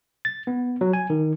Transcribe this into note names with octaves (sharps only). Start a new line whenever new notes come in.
A6
B3
F#3
G#5
D#3